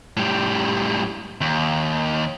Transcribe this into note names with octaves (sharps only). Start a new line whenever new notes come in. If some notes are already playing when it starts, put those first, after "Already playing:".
A2 G3
D#2